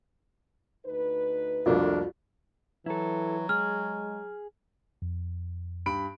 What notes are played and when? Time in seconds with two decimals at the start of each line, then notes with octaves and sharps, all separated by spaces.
0.86 D2 D#4 B4
1.66 C2 F2 A3 A#3 D4 F4 F#4 D5
2.86 E3 F#3 E4 A4
3.49 G#3 G#4 F6
5.02 F2
5.86 G2 B5 D7